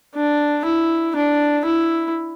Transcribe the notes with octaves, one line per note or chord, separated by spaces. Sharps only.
D4
E4
D4
E4